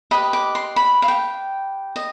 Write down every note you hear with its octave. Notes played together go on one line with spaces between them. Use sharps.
G4 B4 D#5 B5
D6
C6
B5
F5
G5
D#5